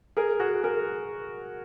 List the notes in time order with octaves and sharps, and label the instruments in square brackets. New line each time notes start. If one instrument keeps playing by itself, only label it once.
[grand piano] G#4 A#4
F#4 G#4
G#4 A#4